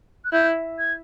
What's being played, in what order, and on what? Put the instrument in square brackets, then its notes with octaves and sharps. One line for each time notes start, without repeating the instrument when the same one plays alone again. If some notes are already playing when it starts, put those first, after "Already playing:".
[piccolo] F#6
[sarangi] E4 [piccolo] G6
[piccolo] G#6